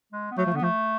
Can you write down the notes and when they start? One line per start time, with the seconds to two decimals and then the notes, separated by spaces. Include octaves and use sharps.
0.12 G#3
0.31 B3
0.37 F#3 A3
0.46 F3
0.54 D3 B3
0.61 F3 A3